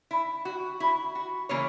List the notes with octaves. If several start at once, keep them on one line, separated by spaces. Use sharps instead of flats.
E4
F#4
E4
F#4
C#3 E3 A#3 C#5